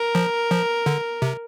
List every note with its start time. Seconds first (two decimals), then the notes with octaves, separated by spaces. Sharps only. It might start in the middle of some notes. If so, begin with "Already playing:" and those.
Already playing: A#4
0.15 F3
0.51 F3
0.86 D3
1.22 C3